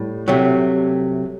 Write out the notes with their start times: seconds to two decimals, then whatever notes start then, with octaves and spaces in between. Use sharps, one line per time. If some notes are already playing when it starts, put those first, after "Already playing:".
Already playing: A2 G3
0.28 C2 C3 F#3 A3